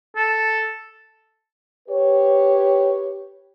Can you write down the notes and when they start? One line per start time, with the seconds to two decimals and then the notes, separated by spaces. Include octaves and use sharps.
0.16 A4
1.89 G4 B4 C#5